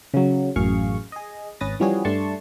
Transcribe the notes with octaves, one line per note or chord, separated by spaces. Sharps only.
C#3 F#3
A1 F#2 G#4 F5 C#6
G#4 D#5
G#1 C#4 B4 D#6 A6 A#6
E3 F3 G3 C#4 F#4 G#4
G2 A3 D4 A5 C6 C#6